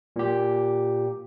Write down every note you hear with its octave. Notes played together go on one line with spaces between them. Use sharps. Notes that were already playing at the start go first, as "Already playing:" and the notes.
A#2 G4